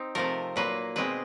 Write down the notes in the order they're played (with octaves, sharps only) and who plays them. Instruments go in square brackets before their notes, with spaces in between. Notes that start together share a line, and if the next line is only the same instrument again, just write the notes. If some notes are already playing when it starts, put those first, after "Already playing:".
Already playing: [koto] C4 D#4
C3 F3 A3 A#4
A#2 F#3 A#3 B4
B2 G#3 C4 B4